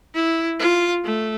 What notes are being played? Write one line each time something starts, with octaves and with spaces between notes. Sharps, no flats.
E4
F4
A3